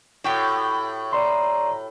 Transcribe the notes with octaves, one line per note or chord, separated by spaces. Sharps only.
A2 F#4 G4 G5
D5 A#5 C6